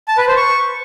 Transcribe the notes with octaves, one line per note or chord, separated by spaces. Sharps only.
A5
B4
C5
C#6